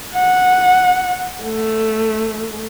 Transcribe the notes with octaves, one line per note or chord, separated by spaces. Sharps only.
F#5
A3